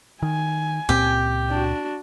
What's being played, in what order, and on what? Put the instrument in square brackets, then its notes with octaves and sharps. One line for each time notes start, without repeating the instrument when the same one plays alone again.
[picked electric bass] D#3 [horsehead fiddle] G#5
[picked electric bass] C#2 A#2 C4 [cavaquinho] G4
[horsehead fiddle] D4 F#4